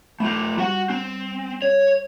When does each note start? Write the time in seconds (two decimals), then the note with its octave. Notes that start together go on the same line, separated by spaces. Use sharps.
0.20 A3 F4 B5 G6
0.58 G3 F#4 F#5
0.90 C4
1.62 C#5